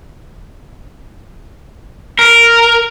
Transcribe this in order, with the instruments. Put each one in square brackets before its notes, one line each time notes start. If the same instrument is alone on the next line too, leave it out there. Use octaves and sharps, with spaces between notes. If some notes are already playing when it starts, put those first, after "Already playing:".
[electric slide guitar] A#4